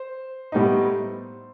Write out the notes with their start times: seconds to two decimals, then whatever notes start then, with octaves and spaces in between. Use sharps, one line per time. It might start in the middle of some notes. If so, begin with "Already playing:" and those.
Already playing: C5
0.52 A2 G3 B3 D#4